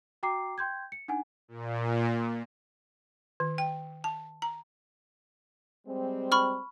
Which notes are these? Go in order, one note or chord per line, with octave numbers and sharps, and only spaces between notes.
F#4 G5 A#5 D6 C7
G5 C6 G6 G#6
C#7
D4 D#4 F#5 G#5
A#2
D#3
G5
A5
A#5
G3 G#3 C4
B5 C#6 F6